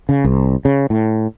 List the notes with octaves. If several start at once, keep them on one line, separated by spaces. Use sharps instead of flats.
C#3
C2
C#3
A2